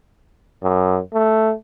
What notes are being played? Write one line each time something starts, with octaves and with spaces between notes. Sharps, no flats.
F#2
A3